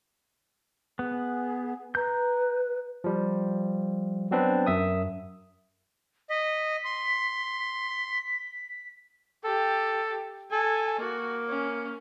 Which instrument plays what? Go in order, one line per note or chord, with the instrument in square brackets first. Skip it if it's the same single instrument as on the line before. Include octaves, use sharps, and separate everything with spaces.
[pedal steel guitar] B3 [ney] G#4
[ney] B4 [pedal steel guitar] A#5 G6
[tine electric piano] F3 G3
F#3 B3 C4 D4 B4
F#2 E5 D#6
[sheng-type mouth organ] D#5 [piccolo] B6
[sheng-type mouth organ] C6
[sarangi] G4 [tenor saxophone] A4
[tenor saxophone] A4 [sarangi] G#5
[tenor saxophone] A#3 [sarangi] F#4
[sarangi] C#4